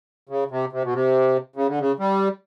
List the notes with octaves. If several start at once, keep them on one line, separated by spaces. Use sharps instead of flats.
C#3
C3
C3
B2
C3
C#3
D3
C#3
G3